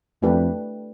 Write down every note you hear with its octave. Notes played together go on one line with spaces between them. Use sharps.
F2 A3 D4 G4 B4